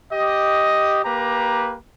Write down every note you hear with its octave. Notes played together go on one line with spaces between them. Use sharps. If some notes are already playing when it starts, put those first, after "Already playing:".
G4 D#5
A#3 G4 B4 A#5